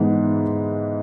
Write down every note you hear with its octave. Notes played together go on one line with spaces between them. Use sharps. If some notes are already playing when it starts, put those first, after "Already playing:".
Already playing: G#2 E3 G#3 B3 E4